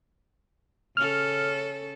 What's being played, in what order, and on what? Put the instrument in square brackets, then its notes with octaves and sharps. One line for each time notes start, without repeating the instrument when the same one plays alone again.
[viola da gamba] C#3 C#4 A4 [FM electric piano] F6